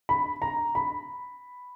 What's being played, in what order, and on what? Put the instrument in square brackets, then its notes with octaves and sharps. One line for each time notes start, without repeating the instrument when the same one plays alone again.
[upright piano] B5
A#5
B5